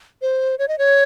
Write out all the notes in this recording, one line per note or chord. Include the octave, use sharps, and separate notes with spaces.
C5
C#5
D#5
C#5